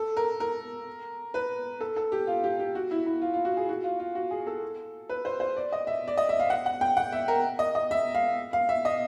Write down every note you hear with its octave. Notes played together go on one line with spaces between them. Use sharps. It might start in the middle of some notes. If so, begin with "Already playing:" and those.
Already playing: A4
A#4
A#4
B4
A4
A4
G4
F4
G4
G4
F#4
E4
E4
F4
F4
F#4
G#4
F#4
F4
F4
F#4
G#4
A4
B4
C5
C5
D5
D#5
E5
D5
D#5
E5
F5
F#5
F#5
G5
F#5
E5
A#4
D#5
D#5
E5
F5
F5
E5
D#5